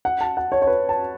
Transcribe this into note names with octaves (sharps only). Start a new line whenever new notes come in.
F#5
A5
F#5
C#5
C#5
B4
A5